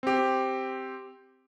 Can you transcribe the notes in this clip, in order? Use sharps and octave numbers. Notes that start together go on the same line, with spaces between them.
C4 G4